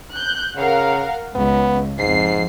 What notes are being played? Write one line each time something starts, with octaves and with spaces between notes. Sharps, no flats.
F#6 G6
C#3 A#4 F5 F#5
C#2 B3
F2 G#2 C7